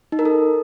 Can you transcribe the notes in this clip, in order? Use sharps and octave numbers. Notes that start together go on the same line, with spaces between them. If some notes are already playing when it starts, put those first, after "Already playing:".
D#4
A#4
A4